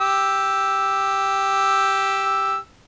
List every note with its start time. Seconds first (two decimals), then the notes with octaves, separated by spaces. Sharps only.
0.01 G4 E6